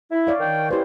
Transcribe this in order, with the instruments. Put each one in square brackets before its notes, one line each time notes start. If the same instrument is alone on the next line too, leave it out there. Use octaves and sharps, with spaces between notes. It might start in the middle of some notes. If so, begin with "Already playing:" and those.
[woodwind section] E4
[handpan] C#5 D5 F5
[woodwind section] D#3 G5
[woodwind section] C#4 E4 C5 [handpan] G4 B4